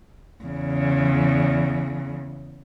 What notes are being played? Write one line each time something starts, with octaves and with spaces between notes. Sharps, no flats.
E2 C#3